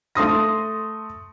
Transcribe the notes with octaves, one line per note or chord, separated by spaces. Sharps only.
A3 C6 D#6 A#6